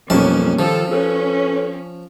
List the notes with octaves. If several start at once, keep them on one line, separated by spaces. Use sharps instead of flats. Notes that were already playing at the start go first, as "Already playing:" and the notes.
B1 F2 G3 A#3 C#4 A5
D#3 F3 G3 F4 A4
C#4 A4 B4 C#5